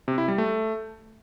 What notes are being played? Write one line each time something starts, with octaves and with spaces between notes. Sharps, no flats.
C3
E4
G3
A3